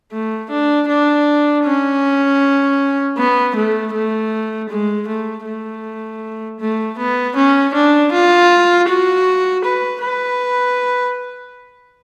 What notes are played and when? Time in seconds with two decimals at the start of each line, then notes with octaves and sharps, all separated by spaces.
0.12 A3
0.51 D4
0.89 D4
1.64 C#4
3.17 B3
3.55 A3
3.93 A3
4.70 G#3
5.08 A3
5.45 A3
6.60 A3
6.98 B3
7.36 C#4
7.74 D4
8.12 F4
8.89 F#4
9.65 B4
10.03 B4